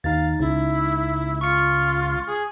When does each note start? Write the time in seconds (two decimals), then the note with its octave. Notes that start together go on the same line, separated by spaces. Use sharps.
0.04 D#2 D#4 F5 A6
0.40 C#2 D#4 E4
1.41 F4 C#6 C#7
2.27 G#4